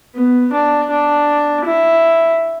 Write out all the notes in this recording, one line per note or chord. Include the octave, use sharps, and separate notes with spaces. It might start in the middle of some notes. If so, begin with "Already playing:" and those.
B3
D4
D4
E4